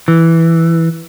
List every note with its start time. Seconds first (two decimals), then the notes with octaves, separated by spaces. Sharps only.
0.08 E3